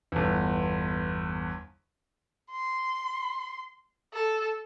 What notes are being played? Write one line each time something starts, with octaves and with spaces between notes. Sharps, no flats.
G1 E2
C6
A4